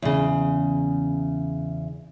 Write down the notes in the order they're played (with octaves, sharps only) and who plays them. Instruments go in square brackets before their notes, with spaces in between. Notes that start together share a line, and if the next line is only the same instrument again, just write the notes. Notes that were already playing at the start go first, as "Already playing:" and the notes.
[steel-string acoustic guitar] E2 C#3